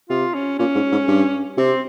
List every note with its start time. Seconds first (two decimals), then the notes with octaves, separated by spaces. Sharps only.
0.09 C3 F4
0.34 C#4
0.59 A#2 C#4
0.75 G#2
0.92 G#2
1.08 G2
1.58 C3 C4